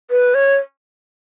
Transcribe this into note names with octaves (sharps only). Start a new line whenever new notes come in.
B4
C#5